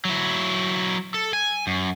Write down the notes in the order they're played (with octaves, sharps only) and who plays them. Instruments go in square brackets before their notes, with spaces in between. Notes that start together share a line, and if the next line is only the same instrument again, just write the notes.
[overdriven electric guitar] F#3 E4
A4
G#5
F#2